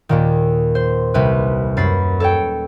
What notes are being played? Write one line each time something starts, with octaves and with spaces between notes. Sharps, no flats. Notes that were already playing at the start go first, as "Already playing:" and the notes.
D#2 A#2 D#3
C5
C2 C3 B4
F#2 B5 A6 C7
A4 C#5 G5